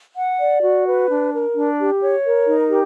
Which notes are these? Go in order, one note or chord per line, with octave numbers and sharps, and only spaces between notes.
F#5
D5
F#4
B4
D4
A#4
D4
G4
C#5
A#4
D#4
G4